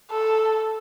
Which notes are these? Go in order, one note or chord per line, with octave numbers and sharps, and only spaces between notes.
A4